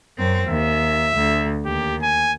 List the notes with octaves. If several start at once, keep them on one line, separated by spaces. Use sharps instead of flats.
F#2 C4
D#2 E5
D2
D#2 G4
G#5